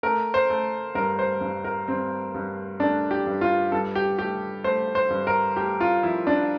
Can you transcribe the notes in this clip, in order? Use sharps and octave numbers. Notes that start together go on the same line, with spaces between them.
A3 A#4
C5
A3
G2 A#4
C5
G2
A#4
G2 C4
G2
A3 D4
G4
G2
F4
G2 A4
G4
A3 G4
A3 C5
C5
G2
A#4
A3 G4
F4
F3 E4
D4